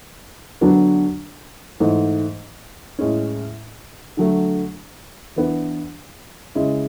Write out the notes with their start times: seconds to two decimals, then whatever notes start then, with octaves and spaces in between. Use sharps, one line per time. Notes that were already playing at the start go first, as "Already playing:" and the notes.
0.61 D3 F#3 B3 D4 F#4
1.80 G#2 E3 A3
2.99 A2 G#3 C#4
4.17 D3 F#3 A3
5.36 E3 B3 D4
6.55 C#3 G#3 C#4 E4